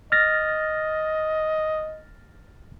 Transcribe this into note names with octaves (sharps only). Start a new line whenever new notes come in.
D#5 F6 A6 A#6